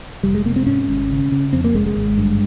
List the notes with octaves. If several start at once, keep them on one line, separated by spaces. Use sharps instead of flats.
F1 G3
G#3
C3 A#3
C4
G#2 C#4
G#1
C#3
C#3
F2 C4
A#3
F1 G#3
G#3
G#1
G2